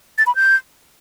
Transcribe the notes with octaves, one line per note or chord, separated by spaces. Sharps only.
A6
B5
G6